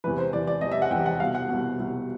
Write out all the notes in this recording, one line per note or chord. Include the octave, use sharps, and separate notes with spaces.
E2 C3 E3 B4
C5
E2 C3 E3 D5
D5
E2 C3 E3 D#5
E5
F#5
E2 C3 E3 G5
F#5
C2 B2 F5
F#5
C2 B2
C2 B2